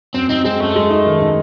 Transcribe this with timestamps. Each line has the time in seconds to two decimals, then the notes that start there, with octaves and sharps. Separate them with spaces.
0.14 F#2 C4
0.29 C4 D#4
0.44 G#3 C4
0.60 F#2 A3
0.76 G#3
0.90 D#4
1.06 D#3
1.21 D#3